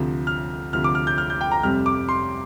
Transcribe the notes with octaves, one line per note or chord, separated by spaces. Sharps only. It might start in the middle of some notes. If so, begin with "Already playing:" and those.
Already playing: D2 C3 F3
F6
D2 C3 F3 F6
D6
F6
G6
F6
G6
G5
A#5
F1 F2 C3 G3 F6
D6
C6